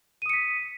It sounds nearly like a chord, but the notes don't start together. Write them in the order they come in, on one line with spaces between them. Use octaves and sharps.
D#7 D#6 C#7 B6